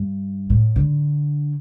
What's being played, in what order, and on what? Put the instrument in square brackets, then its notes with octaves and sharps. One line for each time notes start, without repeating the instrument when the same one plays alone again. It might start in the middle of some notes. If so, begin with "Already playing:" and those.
Already playing: [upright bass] G2
A2
D3